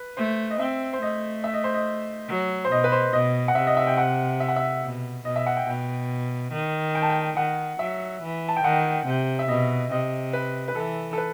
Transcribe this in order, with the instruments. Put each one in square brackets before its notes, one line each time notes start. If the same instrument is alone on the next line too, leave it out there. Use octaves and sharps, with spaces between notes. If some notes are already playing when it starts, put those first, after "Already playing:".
Already playing: [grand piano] B4
[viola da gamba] A3 [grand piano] C5
[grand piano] D#5
[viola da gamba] C4 [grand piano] E5
[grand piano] C5
[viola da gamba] A3 [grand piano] D#5
[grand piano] E5
D#5
C5
D#5
[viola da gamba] F#3
[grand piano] C5
[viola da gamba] B2 [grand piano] D#5
[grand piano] B4
C5
[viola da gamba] B2 [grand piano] D#5
[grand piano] F#5
[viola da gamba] C3 [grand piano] E5
[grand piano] D#5
E5
G5
F#5
E5
F#5
E5
[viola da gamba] B2
[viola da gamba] B2 [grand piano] D#5
[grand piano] E5
F#5
G5
[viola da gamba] B2 [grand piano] G5
[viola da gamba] D#3
[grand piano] G5
A5
G5
[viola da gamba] D#3 [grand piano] F#5
[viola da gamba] F#3 [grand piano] E5
[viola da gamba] E3
[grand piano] A5
G5
[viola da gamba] D#3 [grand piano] F#5
[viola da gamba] C3
[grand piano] E5
[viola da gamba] B2 [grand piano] D#5
[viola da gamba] C3 [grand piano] D#5
[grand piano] B4
B4
[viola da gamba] E3 [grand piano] A4
[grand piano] A4
B4